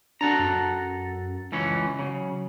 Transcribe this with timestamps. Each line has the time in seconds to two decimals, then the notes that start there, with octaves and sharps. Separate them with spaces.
0.21 D4 F#4 A4 A#5
0.39 F#2
1.52 C#2 E3 C#4
1.99 C#3 F#3